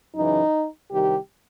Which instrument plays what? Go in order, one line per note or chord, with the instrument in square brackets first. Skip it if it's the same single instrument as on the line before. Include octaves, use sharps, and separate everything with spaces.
[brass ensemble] F#2 C#3 E3 D#4
C2 C3 D#3 G4